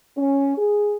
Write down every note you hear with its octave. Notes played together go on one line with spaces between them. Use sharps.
C#4
G#4